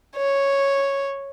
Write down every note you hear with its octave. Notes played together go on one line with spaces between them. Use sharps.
C#5